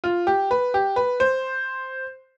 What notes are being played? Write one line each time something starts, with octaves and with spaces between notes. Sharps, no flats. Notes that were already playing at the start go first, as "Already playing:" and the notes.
F4
G4
B4
G4
B4
C5